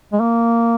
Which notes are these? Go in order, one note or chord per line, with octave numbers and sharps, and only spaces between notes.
G#3
A#3